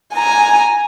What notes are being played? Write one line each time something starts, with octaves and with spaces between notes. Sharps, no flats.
G#5 A#5